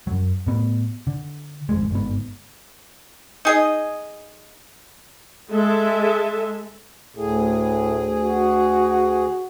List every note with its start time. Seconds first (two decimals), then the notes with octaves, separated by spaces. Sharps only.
0.07 F#2 F#3
0.47 A2 B3
1.07 D3
1.69 G#1 F2 G#3
1.91 G1 G#2 B3
3.45 D#4 G#4 D#5
5.49 G#3 A4 E5
7.16 D2 A2 G#4
8.23 F#4